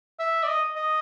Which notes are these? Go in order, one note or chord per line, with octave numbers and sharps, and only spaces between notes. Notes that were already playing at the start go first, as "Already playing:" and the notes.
E5
D5
D#5
D#5